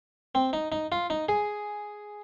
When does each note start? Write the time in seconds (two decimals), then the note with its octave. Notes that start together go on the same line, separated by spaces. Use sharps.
0.35 C4
0.53 D#4
0.72 D#4
0.92 F4
1.10 D#4
1.29 G#4